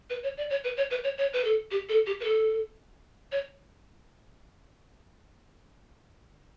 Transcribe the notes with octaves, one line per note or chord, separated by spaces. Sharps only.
B4
C#5
D5
C#5
B4
C#5
B4
C#5
C#5
B4
A4
G4
A4
G4
B4
A4
C#5